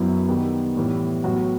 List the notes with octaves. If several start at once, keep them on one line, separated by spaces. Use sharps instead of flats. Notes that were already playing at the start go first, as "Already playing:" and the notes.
Already playing: F#2 F#3 B3 E4
D#3 G3 B3
A2 E3 G3 B3
A2 F#3 B3 F#4